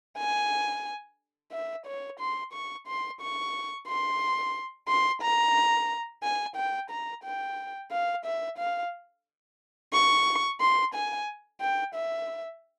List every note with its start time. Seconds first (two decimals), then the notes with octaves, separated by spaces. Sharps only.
0.18 G#5
1.52 E5
1.87 C#5
2.20 C6
2.53 C#6
2.87 C6
3.21 C#6
3.87 C6
4.88 C6
5.22 A#5
6.23 G#5
6.56 G5
6.91 A#5
7.24 G5
7.92 F5
8.25 E5
8.58 F5
9.93 C#6
10.61 C6
10.94 G#5
11.61 G5
11.95 E5